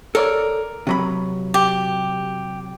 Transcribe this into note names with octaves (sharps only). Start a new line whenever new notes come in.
A4 A#4 C#5 D5
C3 F#3 B5
G4